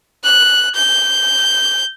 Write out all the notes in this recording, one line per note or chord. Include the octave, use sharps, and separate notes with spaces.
F#6
G6